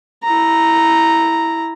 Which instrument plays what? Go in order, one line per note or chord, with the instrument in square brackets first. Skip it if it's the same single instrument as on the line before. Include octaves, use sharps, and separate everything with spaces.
[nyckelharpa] E4 A#5